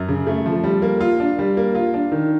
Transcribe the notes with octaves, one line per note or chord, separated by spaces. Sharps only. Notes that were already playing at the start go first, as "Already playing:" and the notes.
Already playing: F#2
C#3
A3
F3
G3
A#3
F4
D4
G3
A#3
F4
D4
D#3